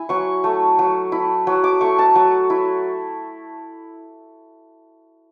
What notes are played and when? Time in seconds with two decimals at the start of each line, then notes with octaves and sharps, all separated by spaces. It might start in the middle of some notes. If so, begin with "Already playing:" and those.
Already playing: E4 G#5
0.09 F#3 C#6
0.44 A3
0.79 F#3
1.12 E4
1.47 F#3
1.64 D6
1.81 A3 C#6
1.99 A5
2.15 F#3
2.50 E4